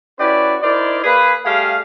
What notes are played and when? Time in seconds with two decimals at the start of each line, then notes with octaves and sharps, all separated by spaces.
0.19 C#4 E4 F#4 G4 B4 D5
0.63 D#4 E4 A#4 C5 D5
1.04 A#3 G#4 B4
1.46 G3 A3 G4 G#4 F5